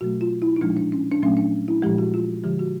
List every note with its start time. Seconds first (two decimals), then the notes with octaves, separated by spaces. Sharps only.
0.01 B2 F#3 A3 F#4
0.21 F4
0.42 E4
0.56 D#4
0.61 A#2 F3 G#3 D4
0.77 D4
0.92 C#4
1.11 D4
1.22 A#2 F#3 A3 C#4
1.37 D4
1.68 E4
1.82 A#2 F3 G#3 G4
1.98 F#4
2.14 F4
2.44 D3 F3 G#3 G4
2.59 F#4